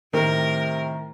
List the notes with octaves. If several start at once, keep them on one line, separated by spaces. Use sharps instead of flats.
A2 C3 D#3 A#4